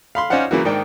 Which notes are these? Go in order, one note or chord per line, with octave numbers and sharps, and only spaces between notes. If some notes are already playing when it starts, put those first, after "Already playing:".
F5 B5 C6
C#4 D#4 C5 D5 F5 F#5
C#3 E3 F#3 A#3 E4 F#4
G#2 D#3 D4 G5